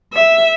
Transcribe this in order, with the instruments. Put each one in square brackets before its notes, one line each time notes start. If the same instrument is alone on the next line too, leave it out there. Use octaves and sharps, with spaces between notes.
[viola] E5